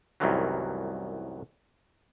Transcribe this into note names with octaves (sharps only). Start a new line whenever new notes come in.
C2 F#2 A2 D#3 E3 F#3